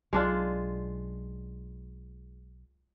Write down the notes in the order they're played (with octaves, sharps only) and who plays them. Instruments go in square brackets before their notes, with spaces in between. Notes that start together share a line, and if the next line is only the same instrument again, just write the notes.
[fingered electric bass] B1 F#3 [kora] G#3 D4 F4